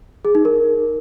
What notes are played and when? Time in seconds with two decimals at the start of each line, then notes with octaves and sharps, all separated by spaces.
0.25 G#4
0.35 D#4
0.45 A#4